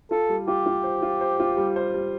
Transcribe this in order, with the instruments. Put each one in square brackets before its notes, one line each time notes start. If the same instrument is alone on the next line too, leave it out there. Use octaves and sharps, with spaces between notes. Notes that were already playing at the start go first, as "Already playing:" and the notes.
[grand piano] F4 [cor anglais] A4
[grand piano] G3
[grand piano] F4 [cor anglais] G4
[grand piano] F4
C5
F4
C5
F4
G3
C5
G3